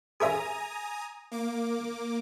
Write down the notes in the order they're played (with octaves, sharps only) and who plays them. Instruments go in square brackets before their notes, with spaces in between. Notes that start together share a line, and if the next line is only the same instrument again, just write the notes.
[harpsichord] G#4 A#4 E5 [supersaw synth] G#5 A#5 D#6
[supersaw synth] A#3 D6